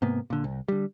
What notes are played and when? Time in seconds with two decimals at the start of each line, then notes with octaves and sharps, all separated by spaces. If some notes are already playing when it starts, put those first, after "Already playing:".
0.02 G#2 C3 A#3 B3
0.30 A#2 D3
0.44 C2
0.68 D3 G3